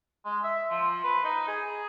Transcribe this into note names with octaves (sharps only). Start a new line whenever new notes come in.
G#3
E5
F3
B4
D#4
G#4